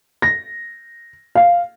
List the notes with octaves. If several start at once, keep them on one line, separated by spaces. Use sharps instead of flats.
A#6
F5